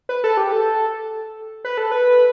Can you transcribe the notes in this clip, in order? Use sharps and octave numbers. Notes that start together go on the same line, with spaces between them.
B4
A4
G4
A4
B4
A4
B4